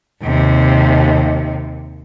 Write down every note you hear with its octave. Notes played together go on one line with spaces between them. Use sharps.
D#2 C3